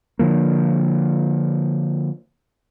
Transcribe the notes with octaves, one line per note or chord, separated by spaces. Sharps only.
D3 F3 A#3